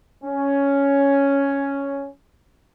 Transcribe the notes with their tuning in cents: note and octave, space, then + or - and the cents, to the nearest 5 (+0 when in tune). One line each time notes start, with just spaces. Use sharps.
C#4 +5